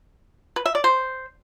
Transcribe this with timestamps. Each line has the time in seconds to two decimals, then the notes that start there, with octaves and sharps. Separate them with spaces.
0.56 B4
0.66 E5
0.75 D5
0.84 C5